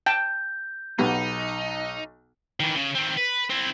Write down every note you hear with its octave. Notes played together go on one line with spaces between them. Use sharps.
G5 A5 G6
B1 B3 D#4 G4
D#3 E3
C#3
D#3 C4
B4
C4 E4